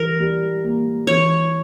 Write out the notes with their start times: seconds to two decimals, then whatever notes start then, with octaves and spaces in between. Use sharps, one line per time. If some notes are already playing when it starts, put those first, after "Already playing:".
Already playing: E3 G3 A#4
0.20 G3
0.64 A#3
1.07 E3 C#5